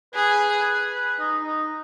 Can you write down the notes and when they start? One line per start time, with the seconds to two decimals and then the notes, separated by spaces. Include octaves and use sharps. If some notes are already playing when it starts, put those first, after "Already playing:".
0.14 G#4 B4
0.53 B4
0.93 B4
1.20 D#4
1.44 D#4